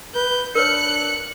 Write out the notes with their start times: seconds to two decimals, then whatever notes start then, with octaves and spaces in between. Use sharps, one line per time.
0.15 B4 G6
0.55 D4 A#4 B4 C#5 F#6 C#7